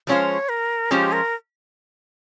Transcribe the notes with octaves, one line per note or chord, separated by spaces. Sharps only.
F3 G#3 C#4 F4 C5 C#5
A#4
F3 G#3 C#4 F4 G4 C5
A#4